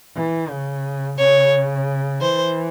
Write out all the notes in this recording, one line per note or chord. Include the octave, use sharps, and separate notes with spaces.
E3
C#3
C#3 C#5
E3 C5